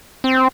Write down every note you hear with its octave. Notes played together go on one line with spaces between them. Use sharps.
C4